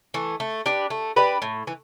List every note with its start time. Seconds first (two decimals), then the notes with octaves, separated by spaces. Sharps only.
0.14 E3 A3
0.40 A3
0.66 D4 G4 B4
0.90 A3
1.16 D4 G4 B4
1.42 A2
1.67 E3